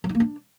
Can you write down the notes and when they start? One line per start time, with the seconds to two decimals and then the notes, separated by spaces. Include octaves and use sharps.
0.04 F#3
0.09 D#4
0.15 A#3
0.20 D4